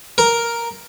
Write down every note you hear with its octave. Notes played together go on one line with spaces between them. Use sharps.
A#4